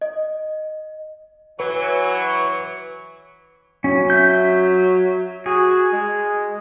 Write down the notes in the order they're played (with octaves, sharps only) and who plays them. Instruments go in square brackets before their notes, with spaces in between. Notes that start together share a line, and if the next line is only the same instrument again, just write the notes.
[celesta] D#5
[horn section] E3 F#3 [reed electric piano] B4
[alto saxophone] F#3 [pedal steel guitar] C#4
[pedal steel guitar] E5 G6
[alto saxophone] F#4 [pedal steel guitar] G#4
[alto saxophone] G#3